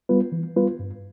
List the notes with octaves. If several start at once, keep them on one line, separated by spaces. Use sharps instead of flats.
G3 B3 F4 B4
E3
G3 B3 F4 B4
G2